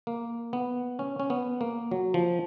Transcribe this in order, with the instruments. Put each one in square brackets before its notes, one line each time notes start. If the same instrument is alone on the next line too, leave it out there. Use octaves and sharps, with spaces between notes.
[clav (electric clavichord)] A#3
B3
C#4
C#4
B3
A#3
F#3
F3